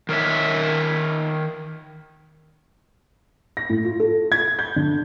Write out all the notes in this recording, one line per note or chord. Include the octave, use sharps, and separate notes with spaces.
D#3 A#4 C#5 E5
A#6
A2
F4
A4
G#6
G6
D3